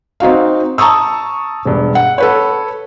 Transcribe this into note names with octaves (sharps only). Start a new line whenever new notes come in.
C4 D#4 F#4 F5
A5 A#5 C#6 D#6 E6
E1 G2
F#5
A4 B4 C#5